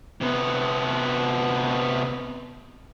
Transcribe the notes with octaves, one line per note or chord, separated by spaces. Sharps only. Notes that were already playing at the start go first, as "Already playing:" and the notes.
C3 B3